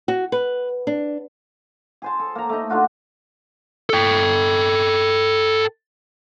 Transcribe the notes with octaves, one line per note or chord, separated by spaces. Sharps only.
F#4
B4
D4
G#4 C5 A5
A4
A#3 A#5
A3 D#4
A3 D4 F4 F#4
A4 G5